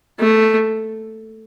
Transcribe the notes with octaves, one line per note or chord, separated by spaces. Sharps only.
A3